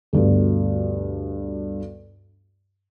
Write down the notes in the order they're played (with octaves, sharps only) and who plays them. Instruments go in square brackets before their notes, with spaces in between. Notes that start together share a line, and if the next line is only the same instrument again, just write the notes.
[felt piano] D2 G2 B2